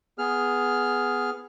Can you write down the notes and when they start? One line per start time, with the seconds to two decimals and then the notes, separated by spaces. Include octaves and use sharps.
0.18 B3 G#4 F6